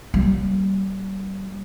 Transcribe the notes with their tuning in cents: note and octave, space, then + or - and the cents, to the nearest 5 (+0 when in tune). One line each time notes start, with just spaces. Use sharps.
G3 -30 A#3 +0